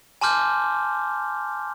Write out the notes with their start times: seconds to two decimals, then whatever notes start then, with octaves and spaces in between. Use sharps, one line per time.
0.21 G#5 A5 C6 D6 F6 G6